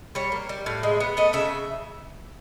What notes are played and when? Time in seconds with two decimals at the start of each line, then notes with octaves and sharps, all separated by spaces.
0.15 G3 C#5
0.32 A#3
0.49 G3
0.66 A2
0.83 G#3
1.00 B3
1.17 A3 D#5
1.33 C#3 E5